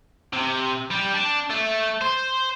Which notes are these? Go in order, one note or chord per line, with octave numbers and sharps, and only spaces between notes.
C3
G3
D4
A3
C5